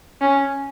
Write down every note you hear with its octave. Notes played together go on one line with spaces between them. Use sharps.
C#4